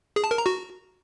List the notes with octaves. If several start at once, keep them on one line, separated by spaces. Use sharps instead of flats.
G#4
A5
A#4
A#5
F#4